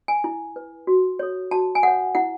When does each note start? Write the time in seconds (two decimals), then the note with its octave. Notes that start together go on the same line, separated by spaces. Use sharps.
0.08 G#5
0.24 E4
0.56 B4
0.87 F#4
1.19 A4 C#5
1.51 F#4 A5
1.75 G#5
1.83 A4 C#5 F#5
2.15 E4 F#5